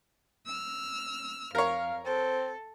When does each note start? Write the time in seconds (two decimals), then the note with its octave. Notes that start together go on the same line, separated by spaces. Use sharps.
0.47 E6 F6
1.55 F2 A#4 C#5 F5
2.04 C4 A4